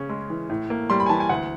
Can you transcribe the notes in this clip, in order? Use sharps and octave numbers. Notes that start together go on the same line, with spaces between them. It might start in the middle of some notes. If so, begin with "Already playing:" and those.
Already playing: C#3 C#4
G#3
E3
A2
A#3
G3 C6
B5
G#5
E3 A5
G#5
D2 F#5